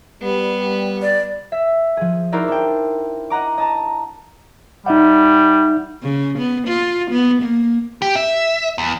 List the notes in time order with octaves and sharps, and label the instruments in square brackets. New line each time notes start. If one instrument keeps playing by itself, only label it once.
[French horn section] G3 [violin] B3
[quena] D5
[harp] E5 B6
F3 G#4
D#4 E4 F#4 A#4 C5 D5
D4 G5
D#5 F#5 A#5 D6
D#5 A5 A#5
[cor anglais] G3 [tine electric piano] D#4 E5 F#5
[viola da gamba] C#3
B3
F4
B3
A#3
[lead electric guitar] G4
E5
E2